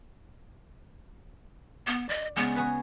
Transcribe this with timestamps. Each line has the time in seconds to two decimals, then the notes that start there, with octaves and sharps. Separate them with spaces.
1.87 B3
2.09 D5 D#5
2.36 C#3 G#3 B3
2.56 F#4 G#4 B4